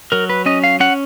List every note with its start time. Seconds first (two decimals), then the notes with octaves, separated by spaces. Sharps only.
0.12 F#3 A#4
0.29 B4
0.46 C#4 D#5
0.64 F5
0.80 C#4 F#5